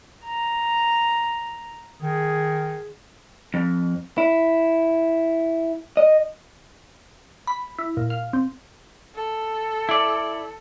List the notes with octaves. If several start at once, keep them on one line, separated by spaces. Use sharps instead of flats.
A#5
D#3 G#4
F2
E4
D#5
B5
E4
A#2
F5
C4
A4
E4 D5